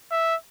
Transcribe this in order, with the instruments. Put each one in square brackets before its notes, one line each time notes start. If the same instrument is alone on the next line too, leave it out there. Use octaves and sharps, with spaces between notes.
[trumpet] E5